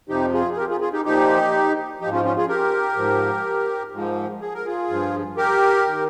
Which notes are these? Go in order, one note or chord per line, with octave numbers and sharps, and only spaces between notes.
F2 C3 F3 D#4 G4
F4 G#4
G#4
G4 A#4
F4 G#4
F4 G#4
D#4 G4
A#2 F3 D#4 G4
F3 D#4 G4
G#2
C#4 F4
C#4 F4
F4 G#4
G4 A#4
G#2 F3
G#2 F3
G#4
A#4
F4 G#4
G2 F3
G4 A#4
D#3